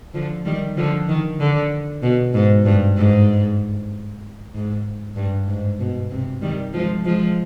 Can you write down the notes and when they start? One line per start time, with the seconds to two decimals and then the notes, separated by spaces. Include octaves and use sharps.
0.14 D3 F3
0.45 D#3 G3
0.77 D3 F3
1.08 D#3
1.40 D3
2.03 B2
2.34 G#2
2.65 G2
2.96 G#2
4.54 G#2
5.16 G2
5.47 G#2
5.79 B2
6.11 C3
6.42 D#3 G3
6.73 F3 G#3
7.05 F3 G#3